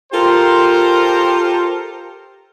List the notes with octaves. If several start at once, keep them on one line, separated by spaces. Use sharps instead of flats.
F4 G4 A4 A#4 C5